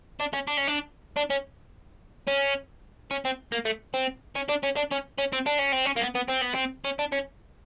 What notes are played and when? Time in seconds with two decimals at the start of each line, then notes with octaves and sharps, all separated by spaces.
0.20 D4
0.33 C#4
0.47 D4
0.57 C#4
0.68 D4
1.17 D4
1.30 C#4
2.28 C#4
3.11 C#4
3.25 C4
3.52 A#3
3.65 A3
3.94 C4
4.35 C#4
4.49 D4
4.63 C#4
4.76 D4
4.91 C#4
5.18 C#4
5.33 C4
5.46 D4
5.59 C#4
5.72 C4
5.85 C#4
5.96 A#3
6.01 B3
6.15 B3
6.29 C4
6.42 B3
6.55 C4
6.84 C#4
6.99 D4
7.12 C#4